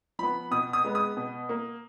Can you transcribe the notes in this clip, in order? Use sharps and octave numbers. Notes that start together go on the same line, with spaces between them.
F3 B3 B5
B2 D#6
D#6
G#3 B3
D#6
B2
A#3